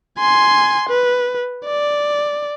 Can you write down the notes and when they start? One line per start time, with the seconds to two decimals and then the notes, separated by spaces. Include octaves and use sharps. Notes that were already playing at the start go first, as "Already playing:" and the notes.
0.18 G#5 C6
0.89 B4
1.65 D5